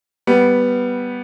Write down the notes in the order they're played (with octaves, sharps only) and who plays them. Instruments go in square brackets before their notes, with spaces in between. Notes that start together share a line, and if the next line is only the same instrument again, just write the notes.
[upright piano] G3 B3